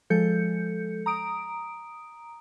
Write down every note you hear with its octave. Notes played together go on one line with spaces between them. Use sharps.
F3 G#3 A4 G6 C#7
A#5 D#6 D7